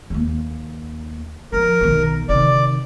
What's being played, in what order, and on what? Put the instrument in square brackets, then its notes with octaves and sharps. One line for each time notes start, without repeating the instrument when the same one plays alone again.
[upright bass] D#2 A#3
[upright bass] F3 [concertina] A#4
[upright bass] B1 D#3
[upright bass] C3 D#3 [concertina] D5